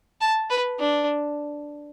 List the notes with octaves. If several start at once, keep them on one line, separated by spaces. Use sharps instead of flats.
A5
B4
D4